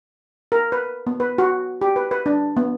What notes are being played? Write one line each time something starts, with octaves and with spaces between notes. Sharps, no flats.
A#4
B4
B3
B4
F#4
G4
B4
B4
D4
B3